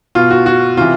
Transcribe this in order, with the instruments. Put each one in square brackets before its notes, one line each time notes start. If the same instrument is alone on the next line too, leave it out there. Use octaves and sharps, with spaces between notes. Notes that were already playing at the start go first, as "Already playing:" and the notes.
[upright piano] B2 F4
F#4
F#4
C3 E3 F4